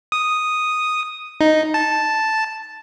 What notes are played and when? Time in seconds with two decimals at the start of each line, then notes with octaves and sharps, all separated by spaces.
0.12 D#6
1.41 D#4
1.74 A5